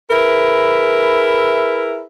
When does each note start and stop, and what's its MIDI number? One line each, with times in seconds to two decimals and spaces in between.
0.11 2.03 64
0.11 2.03 68
0.11 2.03 70
0.11 2.03 71
0.11 2.03 76